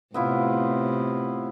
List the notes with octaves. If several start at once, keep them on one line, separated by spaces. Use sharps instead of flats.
A2 C3 B3 E4 F4